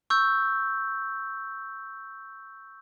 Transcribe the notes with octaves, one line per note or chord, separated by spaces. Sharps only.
C#6 E6 G6